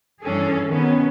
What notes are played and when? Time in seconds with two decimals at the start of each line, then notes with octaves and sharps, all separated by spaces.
0.23 G2 E3 C#4 D4 G#4 A4
0.68 B2 D#3 B3 C#4